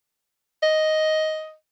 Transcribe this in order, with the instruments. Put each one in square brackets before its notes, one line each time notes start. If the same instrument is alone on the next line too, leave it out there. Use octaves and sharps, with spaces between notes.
[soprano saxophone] D#5